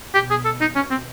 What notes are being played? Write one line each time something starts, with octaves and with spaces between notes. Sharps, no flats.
B2 G4
G#4
A4
D#4
C#4
C4